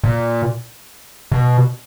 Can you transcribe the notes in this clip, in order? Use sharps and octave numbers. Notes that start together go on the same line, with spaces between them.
A#2
B2